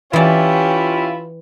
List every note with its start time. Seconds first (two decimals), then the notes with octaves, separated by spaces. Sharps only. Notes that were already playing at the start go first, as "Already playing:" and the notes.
0.13 E3 C#4 E4 F4 G4 D5